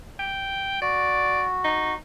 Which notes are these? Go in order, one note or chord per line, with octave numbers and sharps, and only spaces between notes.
G5
F#4 D5
D#4